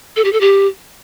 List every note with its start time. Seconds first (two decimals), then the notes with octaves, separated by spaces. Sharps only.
0.16 A4
0.25 G4
0.33 A4
0.41 G4